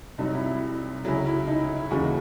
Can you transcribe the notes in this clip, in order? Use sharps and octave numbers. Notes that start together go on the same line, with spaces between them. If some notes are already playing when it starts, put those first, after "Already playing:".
C2 C3 F#3 D#4
E4
E4
C#2 C#3 F#3 E4
E4
D#4
E4
E4
D#2 C#3 E3 F#4